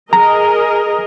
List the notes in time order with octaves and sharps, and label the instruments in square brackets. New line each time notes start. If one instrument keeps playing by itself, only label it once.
[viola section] G#4 A#4 D#5 [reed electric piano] A#5